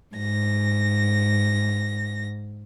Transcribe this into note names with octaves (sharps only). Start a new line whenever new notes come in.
G#2 A#6